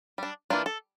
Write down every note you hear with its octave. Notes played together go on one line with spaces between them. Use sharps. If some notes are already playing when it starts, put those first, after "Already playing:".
G3 D4
E3 A#3 D4 F4
A4